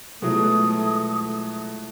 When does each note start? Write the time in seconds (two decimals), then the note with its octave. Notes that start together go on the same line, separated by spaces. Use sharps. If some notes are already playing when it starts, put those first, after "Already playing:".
0.22 B2 F#3 G#3 A3 E4 F4 D#6